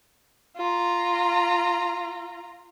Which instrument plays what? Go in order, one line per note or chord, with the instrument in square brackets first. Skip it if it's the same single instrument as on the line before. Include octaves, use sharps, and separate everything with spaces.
[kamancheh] F4 A#5